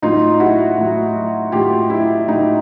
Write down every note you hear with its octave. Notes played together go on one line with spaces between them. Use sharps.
A2 F#3 D#4 F4
E4 F#4
A2 F#3
A2 F#3 F4 G4
E4
A2 F#3 D#4